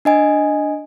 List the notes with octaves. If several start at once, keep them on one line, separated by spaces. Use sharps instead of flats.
D4 D#5 G#5